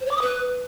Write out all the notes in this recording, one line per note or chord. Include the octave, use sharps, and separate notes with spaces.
C5
C#5
D6
D#6
B4